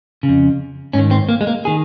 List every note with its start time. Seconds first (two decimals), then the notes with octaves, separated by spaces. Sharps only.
0.23 C#3
0.28 F2
0.93 G#2 D#3 C#4
1.11 C4
1.29 A#3
1.41 G#3
1.47 A#3
1.65 D#3 G#4